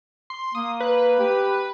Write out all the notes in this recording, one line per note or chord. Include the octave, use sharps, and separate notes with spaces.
C6
A#3 D#6
B4
G4